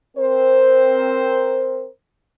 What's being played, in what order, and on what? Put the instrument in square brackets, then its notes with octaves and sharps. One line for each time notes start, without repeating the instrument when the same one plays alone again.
[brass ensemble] C4 A#4 C5